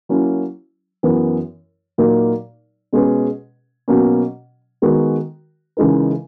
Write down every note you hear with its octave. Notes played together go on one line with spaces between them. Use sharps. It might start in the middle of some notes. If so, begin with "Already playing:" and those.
F#3 A#3 C#4 E4
F#2 E3 B3 E4 A#4
A#2 F#3 A#3 D#4 A#4
B2 G#3 C#4 G#4 B4
B2 F#3 A#3 C#4
D#3 G#3 B3 F#4 A#4
C#3 E3 G#3 D#4 A#4